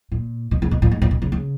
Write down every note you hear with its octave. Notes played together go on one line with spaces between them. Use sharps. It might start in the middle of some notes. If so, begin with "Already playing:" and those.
A#2
B2
C#3
B2
A#2
G#2
A#2
B2
C#3
C#3